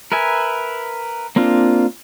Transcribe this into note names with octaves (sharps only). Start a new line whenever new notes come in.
A#4 B4 E5 G#5
A#3 C4 D4 F4